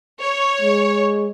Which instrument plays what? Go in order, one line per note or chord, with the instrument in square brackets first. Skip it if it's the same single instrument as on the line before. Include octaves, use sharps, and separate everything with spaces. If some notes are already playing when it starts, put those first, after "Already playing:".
[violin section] C#5
[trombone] G#3